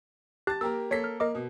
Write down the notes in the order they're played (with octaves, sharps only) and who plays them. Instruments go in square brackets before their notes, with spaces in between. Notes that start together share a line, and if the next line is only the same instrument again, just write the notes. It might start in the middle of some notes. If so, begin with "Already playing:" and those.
[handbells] G4 F#6 [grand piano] A5 A6
[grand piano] A#3 G4 A#4 [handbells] E6
[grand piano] A#3 A4 B6 [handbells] C#5
[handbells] F6
[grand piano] A#3 [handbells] A#4 D#5 D6
[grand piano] B2